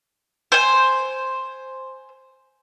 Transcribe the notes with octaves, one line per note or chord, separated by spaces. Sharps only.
C5 G#5